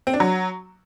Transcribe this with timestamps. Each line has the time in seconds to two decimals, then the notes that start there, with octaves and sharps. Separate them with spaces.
0.07 C4
0.13 D4
0.20 F#3